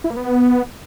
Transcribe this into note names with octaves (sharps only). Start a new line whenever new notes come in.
E4
A#3
B3